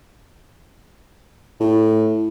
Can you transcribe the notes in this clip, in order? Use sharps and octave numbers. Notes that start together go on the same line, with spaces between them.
A2